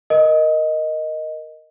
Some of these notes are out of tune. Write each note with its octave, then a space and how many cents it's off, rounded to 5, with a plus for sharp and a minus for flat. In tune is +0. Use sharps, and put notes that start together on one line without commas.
A#4 +5 D#5 +0